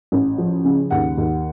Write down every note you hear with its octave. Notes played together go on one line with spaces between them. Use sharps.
A1
F3
C#3
D#2 F#5
D#2